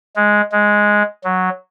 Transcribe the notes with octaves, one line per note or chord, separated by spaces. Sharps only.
G#3
G#3
F#3